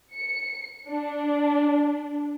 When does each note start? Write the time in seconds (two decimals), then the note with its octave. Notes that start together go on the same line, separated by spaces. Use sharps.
0.15 C#7
0.87 D4